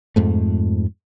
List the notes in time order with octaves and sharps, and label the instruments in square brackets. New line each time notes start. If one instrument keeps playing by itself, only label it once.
[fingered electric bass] F2 G#2 A3